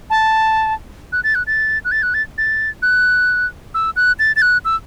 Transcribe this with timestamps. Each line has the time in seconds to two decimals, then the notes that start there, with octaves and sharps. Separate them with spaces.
0.10 A5
1.12 F#6
1.24 A6
1.35 F#6
1.47 A6
1.85 F#6
1.92 A6
2.03 F#6
2.14 A6
2.38 A6
2.82 F#6
3.74 E6
3.96 F#6
4.19 A6
4.36 A6
4.42 F#6
4.65 E6